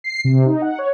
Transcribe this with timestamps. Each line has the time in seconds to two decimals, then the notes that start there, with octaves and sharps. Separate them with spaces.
0.04 C7
0.25 C3
0.46 D#4
0.62 F#5
0.79 C#5